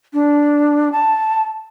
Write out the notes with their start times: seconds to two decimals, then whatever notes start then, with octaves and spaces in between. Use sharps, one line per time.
0.13 D4
0.92 A5